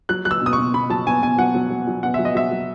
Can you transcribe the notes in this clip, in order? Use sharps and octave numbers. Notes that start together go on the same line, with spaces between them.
F#3 F#6
F#3 F#6
E6
B2 D#6
B2 C#6
B2 B5
F#3 A5
B2 G#5
B2 G#5
F#3 F#5
F#3
F#3
F#3
B2 F#5
F#3 E5
D#5
F#3 E5
F#3